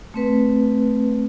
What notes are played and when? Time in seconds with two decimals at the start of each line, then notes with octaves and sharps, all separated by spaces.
0.14 A3 C4 B4